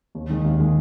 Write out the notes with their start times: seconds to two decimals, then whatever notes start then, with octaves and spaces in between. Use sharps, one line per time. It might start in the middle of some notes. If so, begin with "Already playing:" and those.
0.15 D#2
0.29 D#3 G#3
0.45 D#2
0.60 D#3 G#3